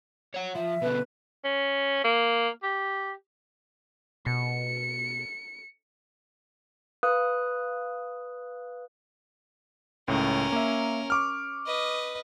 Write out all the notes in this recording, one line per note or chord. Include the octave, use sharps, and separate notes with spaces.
C#5 F#5
F3 E5
B2 D3 B4
C#4
A#3
G4
B2 C#7
B4 F5 D#6 F#6
C#2 A2 C#4 A#4
A#3 E5
C#6 D6 F6
B4 D#5